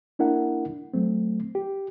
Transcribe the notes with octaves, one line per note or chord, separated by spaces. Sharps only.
A#3 D4 E4 A#4 F#5
F#3 A3 C4
G4